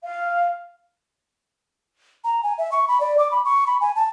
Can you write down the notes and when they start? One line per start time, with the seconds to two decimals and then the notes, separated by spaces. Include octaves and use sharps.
0.03 F5
2.24 A#5
2.43 G#5
2.58 E5
2.72 C#6
2.88 B5
3.00 D5
3.18 D6
3.31 B5
3.45 C#6
3.67 B5
3.81 G#5
3.96 A5